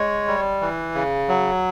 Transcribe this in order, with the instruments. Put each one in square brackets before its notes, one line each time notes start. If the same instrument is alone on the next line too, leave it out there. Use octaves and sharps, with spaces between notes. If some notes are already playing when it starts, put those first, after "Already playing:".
Already playing: [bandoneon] G#3 C#5
G3
E3
C#3
F#3